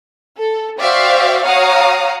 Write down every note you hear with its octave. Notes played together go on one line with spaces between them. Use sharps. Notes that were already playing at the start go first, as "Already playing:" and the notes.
A4
F#4 C5 D5 E5 F5 G5
F#4 C#5 F5 F#5 A#5 D#6